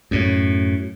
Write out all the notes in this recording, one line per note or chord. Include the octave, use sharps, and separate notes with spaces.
F#2 A2